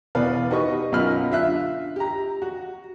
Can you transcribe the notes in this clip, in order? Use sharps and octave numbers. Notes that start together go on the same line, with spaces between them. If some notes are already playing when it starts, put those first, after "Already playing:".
E2 B2 B4 D5 F5
D#4 F#4 G4 B4 D#5 C#6
B1 F#2 F4 D#5 B5 F6
D3 F4 E5 F#6
G4 A#5
F#4